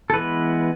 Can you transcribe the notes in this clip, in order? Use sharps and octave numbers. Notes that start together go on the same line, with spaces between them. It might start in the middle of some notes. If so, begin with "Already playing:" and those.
A4
E3 G#3 B3 B4